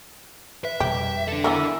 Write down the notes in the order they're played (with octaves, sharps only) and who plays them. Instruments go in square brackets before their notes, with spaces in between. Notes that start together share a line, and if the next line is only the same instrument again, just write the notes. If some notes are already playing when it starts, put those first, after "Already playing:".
[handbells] B4 [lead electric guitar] E5
[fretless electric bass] F2 B2 G3 [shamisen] G4
[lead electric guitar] D4 A4
[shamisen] E3 B3 A#4 [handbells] E5 D6 E6